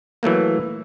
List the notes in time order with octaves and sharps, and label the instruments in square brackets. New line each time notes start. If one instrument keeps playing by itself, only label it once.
[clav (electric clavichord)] E3 F#3 A3 A#3